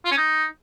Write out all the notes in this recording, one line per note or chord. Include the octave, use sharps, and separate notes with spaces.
F4
C#4
D#4